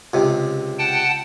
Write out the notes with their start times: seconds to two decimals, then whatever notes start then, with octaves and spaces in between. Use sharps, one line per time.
0.14 C#2 C3
0.79 F#5 G5 A5